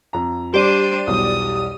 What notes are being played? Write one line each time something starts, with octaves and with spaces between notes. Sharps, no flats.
F2 A#5
G3 D4 G4 C5 D5 D#7
B1 E2 G3 D#6